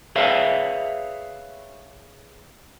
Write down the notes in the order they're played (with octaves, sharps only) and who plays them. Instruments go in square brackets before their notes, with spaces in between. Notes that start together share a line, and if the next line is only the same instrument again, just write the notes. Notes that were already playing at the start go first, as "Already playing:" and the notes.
[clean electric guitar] G#4 B4 C#5 E5 F5